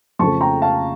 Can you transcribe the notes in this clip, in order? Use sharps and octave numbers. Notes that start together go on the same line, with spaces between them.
F2 C#3 F3 A3 A5 C#6
G5 A#5
F5 A5